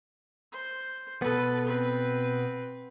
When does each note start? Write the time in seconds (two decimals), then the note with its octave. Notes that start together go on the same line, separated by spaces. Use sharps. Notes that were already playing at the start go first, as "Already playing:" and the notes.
0.52 C5
1.22 B2 B3 A4 B4
1.65 C4 B4